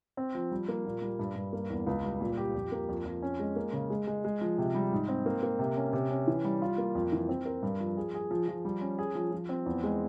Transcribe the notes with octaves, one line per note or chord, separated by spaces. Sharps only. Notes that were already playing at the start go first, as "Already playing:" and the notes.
C4
F3
G3
A#3
A#2
G3
G2
G2
A#3
E2
C#2
G3
A#2
G4
F2
A#3
F2
F2
C#4
G#3
A#3
C#3
G#3
G#3
G#3
F3
C3
G3
G#2
C4
A#3
A#3
C3
C#4
C3
C#4
E3
G3
F4
A#3
F2
E3
C4
A#4
G2
F3
G#4
G#4
F3
F3
G3
C#4
G#4
F3
F3
C4
E2
G#3